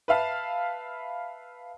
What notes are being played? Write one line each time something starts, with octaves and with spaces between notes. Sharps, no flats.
B4 E5 F5 A5